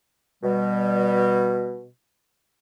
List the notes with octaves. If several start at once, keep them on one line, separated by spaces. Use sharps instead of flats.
B2 G3